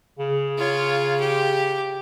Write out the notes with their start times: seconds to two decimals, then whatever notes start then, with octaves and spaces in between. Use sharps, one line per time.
0.19 C#3
0.58 F4 C#5
1.21 G4